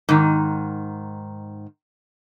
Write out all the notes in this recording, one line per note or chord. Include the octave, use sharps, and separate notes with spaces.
G#2 D#3